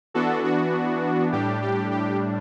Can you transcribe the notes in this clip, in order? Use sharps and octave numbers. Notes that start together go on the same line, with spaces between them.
E3 B3 D4 F#4 A4
F#4
A2 G3 D4 G4
G4
G4